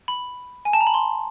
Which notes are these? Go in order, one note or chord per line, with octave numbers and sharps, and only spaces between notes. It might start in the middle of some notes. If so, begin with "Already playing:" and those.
B5
G#5
A5
A#5
B5
C6